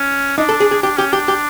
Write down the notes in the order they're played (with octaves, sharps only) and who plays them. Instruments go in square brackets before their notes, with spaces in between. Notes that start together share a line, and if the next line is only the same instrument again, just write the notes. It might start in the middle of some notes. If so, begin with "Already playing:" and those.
Already playing: [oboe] C#4
[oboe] D4 [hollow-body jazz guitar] D#4
[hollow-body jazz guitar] A4
G#4
G#4
[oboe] D4 [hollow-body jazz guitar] G4
[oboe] C#4 [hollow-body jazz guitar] G4
[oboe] D4 [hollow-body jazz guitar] G4
[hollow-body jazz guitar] G4